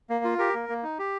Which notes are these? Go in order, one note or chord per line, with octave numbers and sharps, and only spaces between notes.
A#3
F4
G4 A#4
A#3
A#3
D#4
G4